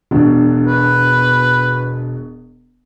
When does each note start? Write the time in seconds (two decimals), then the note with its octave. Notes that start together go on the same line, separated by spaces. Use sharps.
0.11 E1 B2 D4
0.67 B4